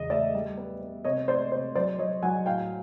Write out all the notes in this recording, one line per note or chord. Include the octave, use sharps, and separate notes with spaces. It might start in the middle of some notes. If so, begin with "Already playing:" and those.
Already playing: E2 C#3 D#5
A3 D5 E5
G3
B3
B3
C3 C#5 D#5
A3 C5 D5
C3 C5
F#3 C5 D5
F#3 C#5 D#5
F#3 F#5 G#5
A2 F5 G5